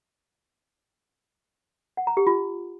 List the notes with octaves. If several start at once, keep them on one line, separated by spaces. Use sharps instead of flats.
F#5
A#5
G4
F4